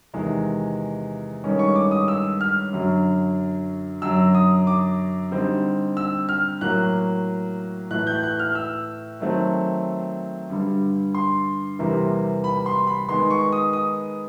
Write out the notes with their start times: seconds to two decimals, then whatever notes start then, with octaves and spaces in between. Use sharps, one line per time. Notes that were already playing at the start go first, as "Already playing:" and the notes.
0.14 E2 C3 D#3 G#3
1.44 G2 D#3 G#3 C#4
1.59 C#6
1.76 D6
1.91 D#6
2.08 E6
2.41 F6
2.73 F#2 D3 F#3
4.02 F#2 D3 F#3 E6
4.35 D#6
4.67 D6
5.31 D3 G3 C4 D#4
5.97 E6
6.29 F6
6.61 A2 F#3 A#3 F#6
7.91 A2 E3 A3 F#6
8.07 G6
8.23 F#6
8.39 F6
8.55 E6
9.20 D#3 F#3 A3 C4
10.50 G2 D3 G3
11.15 C6
11.79 E2 C3 E3 G3 A#3
12.44 B5
12.66 C6
12.87 B5
13.09 D#3 G#3 B3 C6
13.31 C#6
13.53 D#6
13.73 D#6